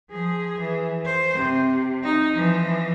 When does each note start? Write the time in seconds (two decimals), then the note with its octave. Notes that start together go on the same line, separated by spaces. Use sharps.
0.10 F3 G#4
0.59 E3
1.05 C5
1.34 C3
2.03 D#4
2.34 E3 F3